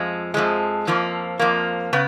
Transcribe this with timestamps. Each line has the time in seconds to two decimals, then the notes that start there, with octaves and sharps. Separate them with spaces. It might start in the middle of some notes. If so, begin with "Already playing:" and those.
Already playing: F2 F3 G#3
0.34 F2 F3 G#3
0.87 F2 F3 A#3
1.39 F2 F3 A#3
1.93 C#3 B3